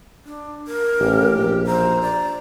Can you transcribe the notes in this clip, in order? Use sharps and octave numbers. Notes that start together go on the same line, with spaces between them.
D4
A#4
A1 G4
A#1
C5 A#5
D5